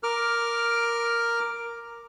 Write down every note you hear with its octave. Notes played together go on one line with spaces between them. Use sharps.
A#4 D6 F6